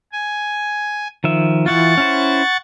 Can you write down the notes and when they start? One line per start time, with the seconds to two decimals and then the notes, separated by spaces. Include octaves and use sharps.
0.13 G#5
1.24 D#3 F3 E5
1.66 E3 E4 F4 F#5 C#6 A6
1.97 C#4 E4 C5